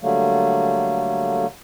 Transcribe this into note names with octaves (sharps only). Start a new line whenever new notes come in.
D3 F#3 G3 A3 A#3